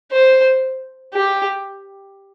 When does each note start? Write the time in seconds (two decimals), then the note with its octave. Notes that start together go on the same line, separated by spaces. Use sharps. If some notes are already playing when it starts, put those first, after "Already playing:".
0.12 C5
1.13 G4